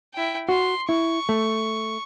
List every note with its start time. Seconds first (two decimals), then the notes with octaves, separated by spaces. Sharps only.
0.14 E4 G5
0.49 F#4 C6
0.89 E4 C#6
1.29 A3